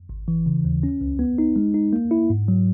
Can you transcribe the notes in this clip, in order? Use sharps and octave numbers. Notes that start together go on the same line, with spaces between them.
G#1
E3
C#3
D#2
C#4
C#2
B3
D#4
G#3
D#4
A#3
E4
G#2
F#3